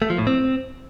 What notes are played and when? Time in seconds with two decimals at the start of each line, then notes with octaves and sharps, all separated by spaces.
0.02 A3
0.10 F3
0.18 A2
0.27 C4